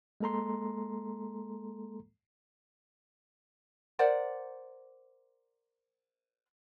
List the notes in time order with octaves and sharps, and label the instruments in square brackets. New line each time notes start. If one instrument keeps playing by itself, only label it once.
[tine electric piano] G#3 A#3 A4 A#5 C6
[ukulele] A#4 C5 D5 F#5